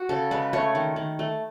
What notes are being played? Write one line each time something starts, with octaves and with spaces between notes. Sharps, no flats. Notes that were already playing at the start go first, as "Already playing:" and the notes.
Already playing: F#4
C#3 A4
G#3 B4
A3 C#5
D#3
D#3
A3